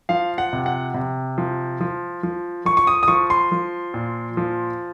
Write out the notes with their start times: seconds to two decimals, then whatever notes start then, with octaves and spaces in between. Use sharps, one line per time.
0.09 F3 F5
0.38 F#5
0.53 C3
0.66 F#5
0.94 C3
1.38 F3
1.81 F3
2.23 F3
2.65 F3 C#6
2.77 C#6
2.87 D#6
3.03 D#6
3.08 F3 C#6
3.30 C6
3.52 F3
3.94 A#2
4.37 F3